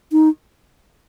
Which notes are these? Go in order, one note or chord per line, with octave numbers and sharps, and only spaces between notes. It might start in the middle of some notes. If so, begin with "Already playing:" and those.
D#4